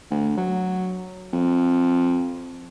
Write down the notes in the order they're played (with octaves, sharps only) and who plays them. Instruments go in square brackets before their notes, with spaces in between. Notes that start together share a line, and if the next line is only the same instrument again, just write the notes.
[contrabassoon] D2
F#3
F2